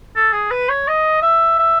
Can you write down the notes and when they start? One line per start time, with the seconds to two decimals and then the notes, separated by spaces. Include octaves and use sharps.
0.16 A4
0.33 G#4
0.51 B4
0.69 C#5
0.88 D#5
1.22 E5
1.59 E5